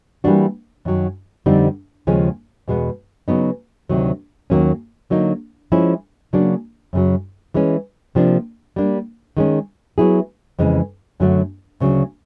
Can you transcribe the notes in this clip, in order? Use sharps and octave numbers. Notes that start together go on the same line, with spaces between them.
E3 G3 A#3 D4 F#4
F#2 D#3 F#3
F2 D3 G3 C4 D#4
D#2 C#3 F3 G#3 C#4
E2 B2 G#3 B3
C#3 F#3 B3 D#4
D2 C3 D#3 F#3
D#2 D#3 F#3 A#3 C#4
D3 F#3 A#3 D#4
F3 G#3 C#4 E4
C#3 F#3 A#3 D4
F#2 C#3 F#3
E3 G#3 C#4
C3 F3 A#3 D4
G3 A#3 D4
D#3 G#3 C#4
F#3 B3 E4 G#4
F2 C#3 E3 G#3
F#2 D3 F#3 A3
D2 C#3 F#3